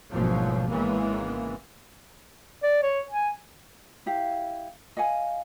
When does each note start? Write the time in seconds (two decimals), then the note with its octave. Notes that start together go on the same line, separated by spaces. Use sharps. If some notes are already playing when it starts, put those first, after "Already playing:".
0.11 G#1 D2 B2 F3 F#3 G#3
0.68 G#1 C#3 E3 G#3 A#3 B3
2.63 D5
2.83 C#5
3.11 G#5
4.06 E4 G4 F5
4.97 D#5 F5 F#5 G#5